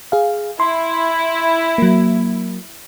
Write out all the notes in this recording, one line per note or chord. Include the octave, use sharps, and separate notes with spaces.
G#4 F5
E4 C6
F#3 A#3